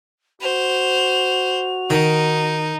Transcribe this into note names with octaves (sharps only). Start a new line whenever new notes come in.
F#4 C5 F7
D#3 D#4